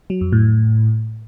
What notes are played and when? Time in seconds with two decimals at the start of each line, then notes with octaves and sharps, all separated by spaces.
0.10 F#3
0.21 F2
0.32 A2